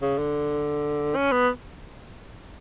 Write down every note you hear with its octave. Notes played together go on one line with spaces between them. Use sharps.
C#3
D3
C#4
B3